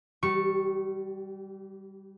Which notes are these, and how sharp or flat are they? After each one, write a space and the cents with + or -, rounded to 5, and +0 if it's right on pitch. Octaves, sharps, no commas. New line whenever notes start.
G3 +0 G4 -40 C#6 -10